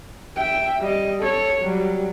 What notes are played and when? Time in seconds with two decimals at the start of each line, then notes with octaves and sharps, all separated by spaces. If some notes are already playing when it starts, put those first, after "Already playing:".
0.36 E5 G5
0.81 G3 D#5
1.21 A4 C#5
1.62 F#3 G3